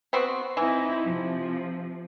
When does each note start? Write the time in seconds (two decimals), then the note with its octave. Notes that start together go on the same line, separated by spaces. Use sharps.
0.13 B3 C4 F#4
0.57 E3 C4 D#4 E4
1.04 C3 F3